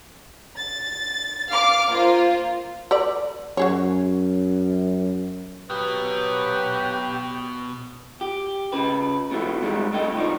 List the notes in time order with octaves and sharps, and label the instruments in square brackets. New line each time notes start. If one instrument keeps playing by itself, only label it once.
[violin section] A6
F5 D6 F6
A#3 F4 C5
[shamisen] A4 B4 D5
[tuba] F#2 [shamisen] F#4 G#4 C#5
[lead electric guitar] B2 B3 [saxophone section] F#3 B4 [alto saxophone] G4
[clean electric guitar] G4
C#3 B4
B2 E3 A3
G#2 D#3 G3 G#3
C2 D3 A3 A4 D#5 G5
D2 D#3 F3 D#4 D5